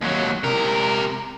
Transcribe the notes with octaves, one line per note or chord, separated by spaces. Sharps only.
D#2 F#3
C3 A#4